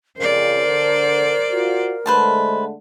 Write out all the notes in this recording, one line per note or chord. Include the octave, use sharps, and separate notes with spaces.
F2 C#3 A#4 C5 D5
D3
F4 F#4
D3 G#3 A3 B4 C5 A5